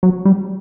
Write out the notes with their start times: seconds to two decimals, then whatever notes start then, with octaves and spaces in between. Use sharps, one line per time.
0.03 F#3
0.25 G3